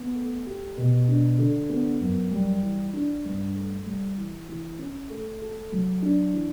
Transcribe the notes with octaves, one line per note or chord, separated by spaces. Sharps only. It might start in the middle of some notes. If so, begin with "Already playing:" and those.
Already playing: B3
A3
G4
B2
D4
D3
B3
F#2
G3
E3
D4
G2
A3
G3
E3
E3
C#4
A3
A4
F#3
D4
E3